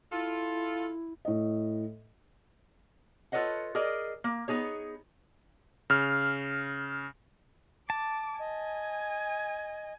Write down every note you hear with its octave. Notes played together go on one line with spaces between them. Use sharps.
E4 F4 A4
A2 D#5
F4 A4 B4 C#5 D#5 F#5
G#4 A#4 D5 D#5
A#3
B3 D#4 G#4 C#5
C#3 F6
A5 D6
D#5 G#5